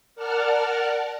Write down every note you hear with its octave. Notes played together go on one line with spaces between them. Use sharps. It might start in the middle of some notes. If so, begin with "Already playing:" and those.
A#4 D5 F#5 A5 F6